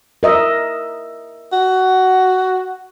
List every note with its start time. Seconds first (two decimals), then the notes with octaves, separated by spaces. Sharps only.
0.23 A#4 D#5 E5
1.52 F#4